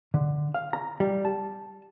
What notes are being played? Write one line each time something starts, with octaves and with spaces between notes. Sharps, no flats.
D3
F5
A#5
G3
A5